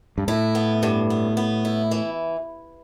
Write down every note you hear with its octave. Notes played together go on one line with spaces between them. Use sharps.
G2
A2 E4
B3
G2
B3
B3
E4
E3